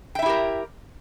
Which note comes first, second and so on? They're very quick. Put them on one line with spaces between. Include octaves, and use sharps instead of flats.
G5 E5 E4 G4 A#4